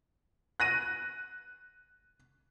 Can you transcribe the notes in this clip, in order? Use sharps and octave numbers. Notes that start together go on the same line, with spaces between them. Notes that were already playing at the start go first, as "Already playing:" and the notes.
F#6 A#6 D#7